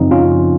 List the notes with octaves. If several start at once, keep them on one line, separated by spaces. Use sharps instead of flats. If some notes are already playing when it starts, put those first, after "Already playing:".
Already playing: F#2 C#3 F3 C4 D#4
C#4 F4